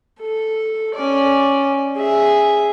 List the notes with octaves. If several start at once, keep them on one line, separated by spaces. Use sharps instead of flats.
A4
C#4 D5
G#4 E5